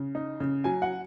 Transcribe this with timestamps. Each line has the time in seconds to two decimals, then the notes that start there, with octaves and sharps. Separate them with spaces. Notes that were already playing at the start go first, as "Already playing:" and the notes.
Already playing: C#3
0.15 D#4
0.40 C#3
0.64 F#3 G#5
0.82 F#5